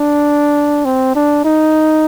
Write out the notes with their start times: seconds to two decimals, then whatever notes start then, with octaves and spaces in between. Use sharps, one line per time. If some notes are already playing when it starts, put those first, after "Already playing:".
Already playing: D4
0.85 C4
1.15 D4
1.45 D#4